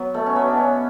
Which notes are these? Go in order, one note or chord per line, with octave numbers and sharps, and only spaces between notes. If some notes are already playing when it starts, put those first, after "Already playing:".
Already playing: F#3 B3
B2 A3
C#4
F#3 B3
D4
B2 C#4